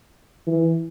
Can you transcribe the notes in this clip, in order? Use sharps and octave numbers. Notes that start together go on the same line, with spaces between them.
E3